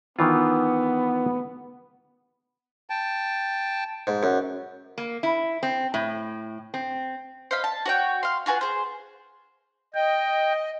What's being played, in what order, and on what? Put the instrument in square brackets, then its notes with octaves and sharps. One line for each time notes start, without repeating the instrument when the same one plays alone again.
[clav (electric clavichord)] D#3 E3 F4 [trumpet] B3
[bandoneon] G5 A5
[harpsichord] G#2
F#2
[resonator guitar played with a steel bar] A#3
E4
C4
A2
C4
[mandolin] C5 D#5 F5 B5
A5
F#4 C#5 G5
F5 C6
F4 F#4 G#4 B4
G#4 C5
[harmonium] D#5 [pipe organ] G5